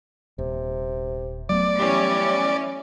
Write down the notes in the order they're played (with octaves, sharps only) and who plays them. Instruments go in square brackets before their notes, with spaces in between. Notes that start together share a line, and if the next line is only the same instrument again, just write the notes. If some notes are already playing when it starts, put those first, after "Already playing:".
[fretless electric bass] D#1 [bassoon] C3
[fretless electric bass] F#3 A3 B3 [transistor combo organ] D5
[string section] E3 C#4 [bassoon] G3